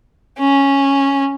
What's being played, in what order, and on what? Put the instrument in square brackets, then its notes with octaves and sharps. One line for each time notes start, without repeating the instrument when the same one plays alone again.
[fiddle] C#4